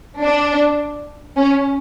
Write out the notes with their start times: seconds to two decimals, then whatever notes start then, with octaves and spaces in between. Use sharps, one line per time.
0.21 D4
1.37 C#4